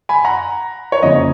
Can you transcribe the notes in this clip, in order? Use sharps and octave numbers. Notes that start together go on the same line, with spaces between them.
G#5 B5
F#5 A#5
C#5
F2 C#3 F3 A#3 D#5